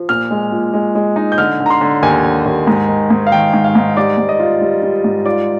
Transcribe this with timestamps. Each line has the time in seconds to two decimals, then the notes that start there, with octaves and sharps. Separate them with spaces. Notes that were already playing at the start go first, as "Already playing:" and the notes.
Already playing: F3
0.09 A#2 F6
0.31 G#3
0.52 A#2
0.74 G#3
0.95 G#3
1.16 D#4
1.32 G6
1.38 D3 F6
1.60 D3
1.66 A#5
1.70 C6
1.81 D3
2.03 D#2 G#5
2.24 D3
2.46 D#2
2.67 G#2
2.89 D#3
3.10 G#2
3.27 F5
3.32 D#3 G5
3.53 G#2
3.64 F5
3.75 G#2
3.97 G3 D5
4.18 G#2
4.29 D#5
4.40 F4
4.61 G3
4.83 G3
5.04 G#2
5.25 F4 D5